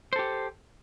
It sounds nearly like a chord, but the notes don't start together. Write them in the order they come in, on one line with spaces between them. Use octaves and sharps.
C5 A4 G4